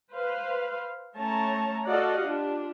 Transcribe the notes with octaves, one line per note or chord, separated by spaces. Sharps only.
B4 C5 F5
A3 C#4 C#5 A5 A#5
F#4 A4 D5 D#5 F5 F#5
D4 F4 G4